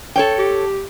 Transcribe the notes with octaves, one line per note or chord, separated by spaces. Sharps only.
A4 C#5 G5
G4